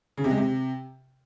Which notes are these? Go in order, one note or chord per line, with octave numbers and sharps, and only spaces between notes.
C#3
C3
G#3
C3